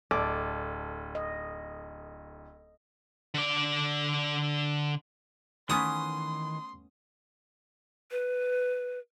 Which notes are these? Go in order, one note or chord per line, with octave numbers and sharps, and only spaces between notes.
D1 A4 D5
D#5
D3 D5
D#3 E3 A3 B3 C#4 C6 D#6
B4